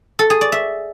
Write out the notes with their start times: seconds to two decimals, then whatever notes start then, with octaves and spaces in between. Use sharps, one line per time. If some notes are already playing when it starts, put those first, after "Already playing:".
0.19 A4
0.30 G#4
0.41 D5
0.52 E5